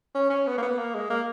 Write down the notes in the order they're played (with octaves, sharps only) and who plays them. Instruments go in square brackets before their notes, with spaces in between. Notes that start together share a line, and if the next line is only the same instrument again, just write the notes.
[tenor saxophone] C#4
C#4
B3
A#3
B3
A#3
G#3
A#3